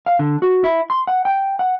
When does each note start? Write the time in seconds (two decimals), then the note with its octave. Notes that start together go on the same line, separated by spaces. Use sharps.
0.06 F5
0.19 D3
0.42 F#4
0.64 E4
0.90 C6
1.07 F#5
1.25 G5
1.59 F#5